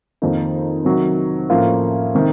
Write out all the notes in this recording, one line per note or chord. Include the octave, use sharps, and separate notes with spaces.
F2 D#3 A#3 D#4
C3 D#3 F#3
A2 F3 A#3 C#4 F4
C3 D#3